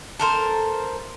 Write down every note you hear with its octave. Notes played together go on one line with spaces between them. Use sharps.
A4 A#4 C5